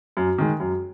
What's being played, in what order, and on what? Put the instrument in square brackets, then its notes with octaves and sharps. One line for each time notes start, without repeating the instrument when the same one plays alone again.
[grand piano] F#2
D#3 G#3
F#2